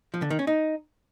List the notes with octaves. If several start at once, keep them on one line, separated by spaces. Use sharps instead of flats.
F3
D3
D#3
C#4
D#4